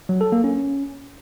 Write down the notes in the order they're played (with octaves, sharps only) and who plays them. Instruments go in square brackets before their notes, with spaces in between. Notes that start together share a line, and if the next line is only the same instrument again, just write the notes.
[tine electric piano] F#3
A4
A#3
C#4